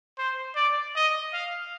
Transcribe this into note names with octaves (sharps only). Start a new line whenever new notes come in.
C5
D5
D#5
F5